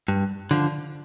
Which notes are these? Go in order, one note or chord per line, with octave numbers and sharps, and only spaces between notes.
G2
D3 F3